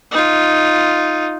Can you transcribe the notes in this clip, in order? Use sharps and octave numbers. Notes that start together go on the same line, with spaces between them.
D#4 F4